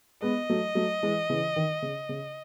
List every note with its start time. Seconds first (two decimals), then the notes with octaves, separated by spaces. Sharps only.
0.22 G#3 B3 D#5
0.50 F#3 A3
0.75 F#3 A3
1.03 E3 G#3
1.30 C#3 E3
1.56 D#3
1.82 C#3
2.09 C#3